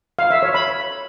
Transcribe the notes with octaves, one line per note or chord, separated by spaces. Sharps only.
F5
E5
C#5
B5